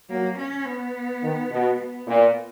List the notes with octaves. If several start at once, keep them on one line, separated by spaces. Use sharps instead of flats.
F#3 A#3
C#4
B3
D#3
B2
B3
A#2